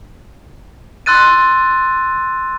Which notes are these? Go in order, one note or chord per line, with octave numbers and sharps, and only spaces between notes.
C6 E6 F#6 A6 D#7